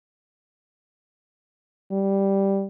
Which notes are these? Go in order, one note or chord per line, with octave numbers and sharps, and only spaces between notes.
G3